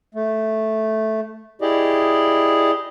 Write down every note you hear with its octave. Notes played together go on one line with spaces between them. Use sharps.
A3
E4 G4 G#4 D5 D#5